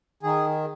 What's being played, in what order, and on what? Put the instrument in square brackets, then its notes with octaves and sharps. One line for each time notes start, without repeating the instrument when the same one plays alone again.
[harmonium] D#3 G#4